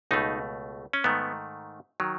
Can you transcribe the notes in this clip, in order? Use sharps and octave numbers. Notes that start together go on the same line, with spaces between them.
C#2 B2 A3 D#4
C#4
G#2 D#3 A3 B3
D#3 F#3